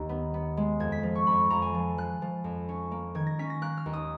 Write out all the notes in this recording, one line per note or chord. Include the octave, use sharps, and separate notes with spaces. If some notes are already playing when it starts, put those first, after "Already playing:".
Already playing: D#2 D#3
B3
B3
G#3
F2 G#6
B6
F3
C#6
F2 B5
F2 A#5
G#5
F3
F3 F#6
F3
F2
C#4
A#3
D#3 G#6
A#6
C#4 B6
A#6
A#3 F#6
F6
D#2
D#6